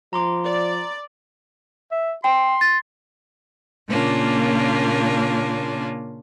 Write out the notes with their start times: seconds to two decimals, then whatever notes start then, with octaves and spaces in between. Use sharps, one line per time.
0.13 F3 A#5 C6 D6
0.45 D5
1.92 E5
2.24 G5 C6
2.61 A6
3.89 A#2 C#3 A#3 C#4 D4 F4